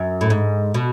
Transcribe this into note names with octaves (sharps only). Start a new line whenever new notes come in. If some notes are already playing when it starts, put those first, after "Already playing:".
Already playing: F#2
A2
G#2
B2